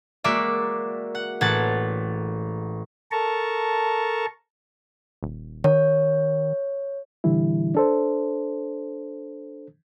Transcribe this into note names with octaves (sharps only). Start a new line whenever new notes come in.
G#3 A#3 F#4 D5 E5
F#5
A1 A4 F#5 G#6 A6
A4 A#4 A5 A#5 C#6
D#1
D#3 C#5
A#2 D3 E3 G3 E4
D4 A4 C5